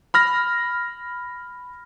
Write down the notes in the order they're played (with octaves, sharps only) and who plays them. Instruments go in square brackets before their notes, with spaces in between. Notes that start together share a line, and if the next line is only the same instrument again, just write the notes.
[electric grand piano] B5 F6 A#6